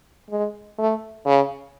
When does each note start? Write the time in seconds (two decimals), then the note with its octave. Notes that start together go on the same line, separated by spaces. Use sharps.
0.30 G#3
0.78 A3
1.25 C#3